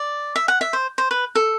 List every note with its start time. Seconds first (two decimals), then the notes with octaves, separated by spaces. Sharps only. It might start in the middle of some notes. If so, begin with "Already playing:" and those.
Already playing: D5
0.36 E5
0.48 F#5
0.61 E5
0.73 C5
0.98 C5
1.11 B4
1.35 A4